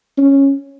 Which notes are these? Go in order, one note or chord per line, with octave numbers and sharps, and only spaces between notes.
C#4